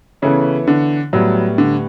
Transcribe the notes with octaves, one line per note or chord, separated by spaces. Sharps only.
C#3 E3 B3 E4 A4 C#5
D3
A2 F#3 G3 B3
D3